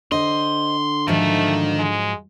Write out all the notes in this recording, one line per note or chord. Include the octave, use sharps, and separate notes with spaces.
D3 C5 D#5 C6
G#2 D#3 F3 F#3 A3
G#3